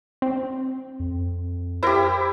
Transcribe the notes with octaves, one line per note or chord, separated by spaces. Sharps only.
C4
F2
E4 G4 A#4 C5